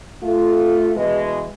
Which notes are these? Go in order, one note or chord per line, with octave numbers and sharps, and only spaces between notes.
A3 F4
B2 E3 G#3